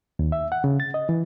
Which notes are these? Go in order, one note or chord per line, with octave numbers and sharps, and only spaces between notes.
D#2
E5
F#5
C#3
A6
D#5
E3